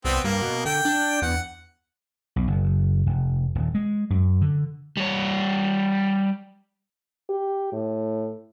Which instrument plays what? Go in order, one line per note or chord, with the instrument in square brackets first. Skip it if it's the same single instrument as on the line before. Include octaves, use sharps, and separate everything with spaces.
[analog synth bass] C2 [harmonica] B3 C4
[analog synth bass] G2 [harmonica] A#3
[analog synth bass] B2
[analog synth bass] D3 [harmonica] G5
[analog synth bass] D4
[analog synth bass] E2 [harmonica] F#5
[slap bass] B1
F#1
F1
D#1
G#3
F#2
D3
[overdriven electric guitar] G3 C#5
[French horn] G4
A2